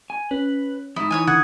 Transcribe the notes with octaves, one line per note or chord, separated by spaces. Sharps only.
G#5
C#4 B4
F2 G#2 D#4 E4 D#6
E3 C#5 F5 G#5
D3 F#5 D#6 G#6